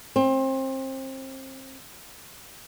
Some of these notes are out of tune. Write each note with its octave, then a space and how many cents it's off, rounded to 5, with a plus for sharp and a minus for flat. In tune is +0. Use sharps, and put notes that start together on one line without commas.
C4 +30